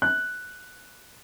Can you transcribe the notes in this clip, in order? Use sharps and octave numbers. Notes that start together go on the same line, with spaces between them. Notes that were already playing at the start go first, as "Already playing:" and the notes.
F#6